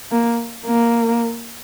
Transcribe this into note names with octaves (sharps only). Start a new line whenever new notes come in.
A#3
A#3